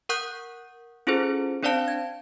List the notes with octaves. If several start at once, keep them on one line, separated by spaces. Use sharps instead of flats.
A#4 F#5 C#6 D#6 F#6 G6
C#4 E4 F4 G#4 A4 C5
C4 D4 C5 D5 F5 A5
G#6